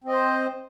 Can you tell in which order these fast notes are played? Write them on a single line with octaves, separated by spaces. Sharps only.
C4 D#5 C5